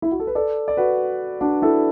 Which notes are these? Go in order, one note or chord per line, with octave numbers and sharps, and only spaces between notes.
E4
F#4
A4
B4
A4 D5
D5
F#4 B4
D4 F#4
E4 A4